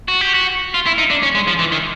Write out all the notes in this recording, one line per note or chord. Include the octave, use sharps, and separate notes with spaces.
F#4
G4
F#4
F4
E4
D#4
D4
C#4
G#3
F3
E3
D#3